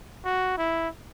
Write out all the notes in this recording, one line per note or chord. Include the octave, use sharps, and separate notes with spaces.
F#4
E4